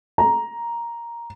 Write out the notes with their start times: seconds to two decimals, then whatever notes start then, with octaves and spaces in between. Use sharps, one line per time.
0.18 A#5